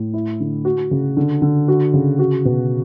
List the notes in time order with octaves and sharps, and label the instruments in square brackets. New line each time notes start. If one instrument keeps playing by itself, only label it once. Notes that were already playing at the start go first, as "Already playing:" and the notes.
Already playing: [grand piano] A2
E4
D3
F#4
C#3
D3
D3
F#4
C#3
F#4
B2